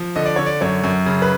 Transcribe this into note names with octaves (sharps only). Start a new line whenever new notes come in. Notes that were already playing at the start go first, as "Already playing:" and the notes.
Already playing: F3
D3 D#5
D5
D3 C#5
D5
F#2 C#5
F#2
C#3
B4